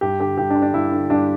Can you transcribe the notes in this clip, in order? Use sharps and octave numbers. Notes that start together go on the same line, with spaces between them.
G2 G4
D3 G4
G2 G4
D4
D3
D4
G2 E4
D3
G2 D4